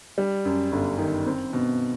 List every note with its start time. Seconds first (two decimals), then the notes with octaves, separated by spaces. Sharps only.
0.18 G3
0.45 F#2
0.72 G1
0.98 D#3
1.26 C4
1.53 B2